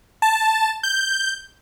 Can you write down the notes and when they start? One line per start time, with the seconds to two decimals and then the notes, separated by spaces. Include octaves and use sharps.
0.22 A5
0.83 G6